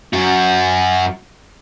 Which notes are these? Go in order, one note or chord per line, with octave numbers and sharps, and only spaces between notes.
F#2 F#4